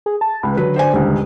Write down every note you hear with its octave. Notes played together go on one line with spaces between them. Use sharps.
G#4
A5
C#2 B4
D3 F#3 B4
C5 D5 G#5
D#1 C#2